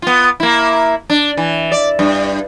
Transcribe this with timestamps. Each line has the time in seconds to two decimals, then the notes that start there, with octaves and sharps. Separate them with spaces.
0.02 B3 F4
0.40 A#3 E4
1.10 D4
1.37 E3
1.72 D5
1.99 G2